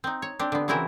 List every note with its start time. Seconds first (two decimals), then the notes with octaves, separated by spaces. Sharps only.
0.04 C4 D#4
0.22 C#5
0.39 C4 D4 G4
0.52 D3 B3
0.68 C#3 E3 C4 E4 F#4 A#4